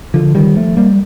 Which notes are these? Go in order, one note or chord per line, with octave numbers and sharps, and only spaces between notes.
D3 F3
D#3 G3
F3 A3
G3 A#3